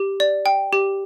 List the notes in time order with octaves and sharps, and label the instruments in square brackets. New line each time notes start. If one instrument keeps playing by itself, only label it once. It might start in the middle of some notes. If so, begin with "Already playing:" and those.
Already playing: [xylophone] G4
D5
G5
G4